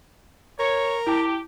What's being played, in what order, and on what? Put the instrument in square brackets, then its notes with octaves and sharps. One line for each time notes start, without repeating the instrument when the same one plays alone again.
[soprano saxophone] A#4 [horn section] C#5
[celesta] E4 A5 [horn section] G4